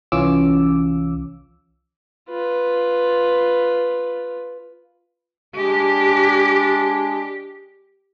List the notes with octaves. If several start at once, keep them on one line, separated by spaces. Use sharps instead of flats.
C2 E3 C#4 F4 D6 E6
F4 B4
G#3 D4 G4